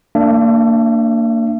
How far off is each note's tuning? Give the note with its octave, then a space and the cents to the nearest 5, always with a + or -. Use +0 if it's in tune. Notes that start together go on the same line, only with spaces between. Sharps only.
A#3 -25 D4 +0 E5 +35